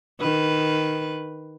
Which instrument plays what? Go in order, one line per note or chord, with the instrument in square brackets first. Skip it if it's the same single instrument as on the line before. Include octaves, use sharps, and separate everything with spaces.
[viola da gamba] D#3 B4